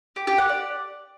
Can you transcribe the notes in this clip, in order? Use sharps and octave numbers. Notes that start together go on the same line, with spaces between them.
G4
G4
F#5
D5